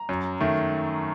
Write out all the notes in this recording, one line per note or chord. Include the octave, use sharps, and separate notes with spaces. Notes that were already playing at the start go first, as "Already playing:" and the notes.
Already playing: A#5
F#2
D#3 A3